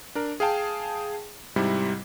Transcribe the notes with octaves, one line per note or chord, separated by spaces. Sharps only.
D4 A#4
G#4 F5 G5 A5
G#2 C3 G3 E4